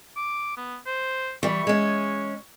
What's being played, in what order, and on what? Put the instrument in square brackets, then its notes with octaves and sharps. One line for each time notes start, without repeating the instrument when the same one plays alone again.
[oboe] D6
B3
C5
[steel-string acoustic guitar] E3 G3 [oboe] C#6
[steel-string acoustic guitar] G#3 C#4